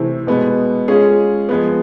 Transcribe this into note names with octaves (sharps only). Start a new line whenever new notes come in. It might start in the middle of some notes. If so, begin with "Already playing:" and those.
Already playing: C3 E3 A3 C4 E4
B2 G#3 B3
G#3 C#4 F4 G#4
F3 G#3 B3